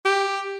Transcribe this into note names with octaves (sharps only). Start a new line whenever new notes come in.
G4